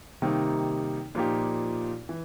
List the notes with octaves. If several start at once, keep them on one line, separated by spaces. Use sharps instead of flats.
C3 D#3 G3 A#3 D#4
A#2 F3 A#3 D#4 G4
E3